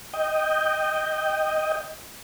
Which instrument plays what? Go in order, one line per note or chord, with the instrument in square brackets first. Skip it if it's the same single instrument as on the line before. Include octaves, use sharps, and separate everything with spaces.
[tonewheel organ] D#5 G5